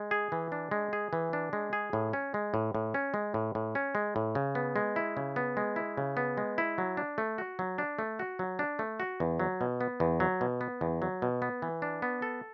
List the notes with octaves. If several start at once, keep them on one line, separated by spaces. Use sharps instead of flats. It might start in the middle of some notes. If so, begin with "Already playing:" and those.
Already playing: G#3
G#4
E3
D4
G#3
G#4
E3
D4
G#3
G#4
A2
C#4
G#3
A2
A2
C#4
G#3
A2
A2
C#4
G#3
A2
C#3
B3
G#3
E4
C#3
B3
G#3
E4
C#3
B3
G#3
E4
F#3
D4
A3
F#4
F#3
D4
A3
F#4
F#3
D4
A3
F#4
E2
F#3
B2
B3
E2
F#3
B2
B3
E2
F#3
B2
B3
E3
D4
B3
A4